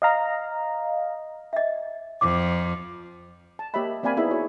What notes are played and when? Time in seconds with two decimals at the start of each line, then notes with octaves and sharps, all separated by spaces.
0.02 D#5 F5 A#5
1.53 D#5 E5
2.21 F2 D6
3.59 A5
3.74 A#3 G4 C#5 D#5 E5 B5
4.03 A#3 C4 D5 F5 G#5 B5
4.17 B3 D#4 E4 G#4 E5 B5
4.31 F#4 C#5